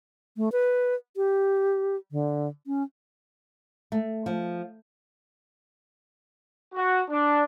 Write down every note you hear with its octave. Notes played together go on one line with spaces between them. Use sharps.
A3
B4
G4
D3
C#4
A3
F3
F#4
D4